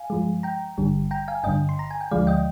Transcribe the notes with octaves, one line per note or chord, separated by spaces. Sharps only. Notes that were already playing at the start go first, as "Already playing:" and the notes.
Already playing: F5 G#5
G2 F3 G#3
G5 A#5
G#1 G2 D3 G3
G5 A#5
F5 G#5
G1 G2 D3 D#5 G5
C6
A#5
G#5
G5
D2 D3 F3 G#3 D5 F5
D#5 G5